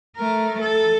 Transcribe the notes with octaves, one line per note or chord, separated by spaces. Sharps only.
A3 A#4
A4